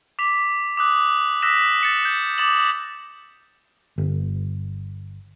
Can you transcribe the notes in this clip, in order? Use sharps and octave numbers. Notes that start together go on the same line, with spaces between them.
D6 B6 F7
D6 D#6 F#6
D#6 E6 F#6 A#6 B6 E7
A6 C#7 E7
G6
D6 D#6 A6 C#7 E7 F#7
G1